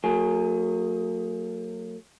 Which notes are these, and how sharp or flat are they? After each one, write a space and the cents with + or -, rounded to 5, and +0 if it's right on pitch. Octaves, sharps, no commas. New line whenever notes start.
F#3 -20 A#3 -40 G#4 +10